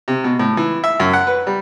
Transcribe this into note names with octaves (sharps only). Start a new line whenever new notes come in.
C3
B2
A2
E3
E5
F#2
F#5
B4
G3